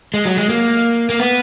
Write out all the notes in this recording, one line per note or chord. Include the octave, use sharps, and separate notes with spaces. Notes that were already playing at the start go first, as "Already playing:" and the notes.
G#3
F#3
G#3
A#3
A#3
B3